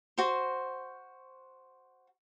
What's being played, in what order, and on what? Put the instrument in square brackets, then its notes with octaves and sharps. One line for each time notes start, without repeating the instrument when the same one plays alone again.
[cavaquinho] F#4 C5